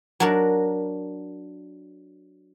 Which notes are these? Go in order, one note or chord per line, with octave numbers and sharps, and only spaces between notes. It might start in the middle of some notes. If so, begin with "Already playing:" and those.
F#3 D4 A#4